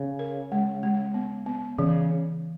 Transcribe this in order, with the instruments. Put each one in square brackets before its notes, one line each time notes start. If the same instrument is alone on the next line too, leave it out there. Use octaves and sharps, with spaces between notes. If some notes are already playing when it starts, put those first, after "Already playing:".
Already playing: [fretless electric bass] C#3
[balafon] A#4
G#3
G#3
B3
B3
[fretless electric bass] C#3 [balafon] E3